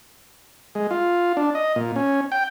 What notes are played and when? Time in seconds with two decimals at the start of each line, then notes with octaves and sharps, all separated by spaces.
0.75 G#3
0.91 F4
1.37 D4
1.55 D#5
1.76 A#2
1.96 C#4
2.32 G5